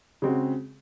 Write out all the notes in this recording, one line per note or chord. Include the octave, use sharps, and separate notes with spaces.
C#3 G#3 C4 F#4